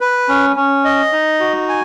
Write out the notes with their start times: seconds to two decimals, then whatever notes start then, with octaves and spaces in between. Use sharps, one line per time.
0.01 B4
0.29 C#4
0.56 C#4
0.85 D#5
1.13 D#4
1.40 F#4
1.69 G#5